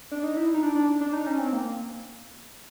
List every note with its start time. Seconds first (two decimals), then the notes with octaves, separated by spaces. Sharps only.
0.11 D4
0.24 D#4
0.37 E4
0.54 D#4
0.63 D4
0.75 D4
1.01 D4
1.13 D#4
1.27 C#4
1.39 C4
1.53 A#3